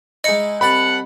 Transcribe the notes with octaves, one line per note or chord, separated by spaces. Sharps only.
G#3 D#4 E4 D#5 C#7
C2 D5 F#5 A5 B5